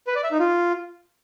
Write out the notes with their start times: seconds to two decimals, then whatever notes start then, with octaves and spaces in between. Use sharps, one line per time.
0.07 B4
0.15 D5
0.23 E5
0.32 D#4
0.40 F4